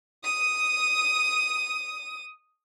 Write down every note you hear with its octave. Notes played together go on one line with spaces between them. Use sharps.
D#6 D#7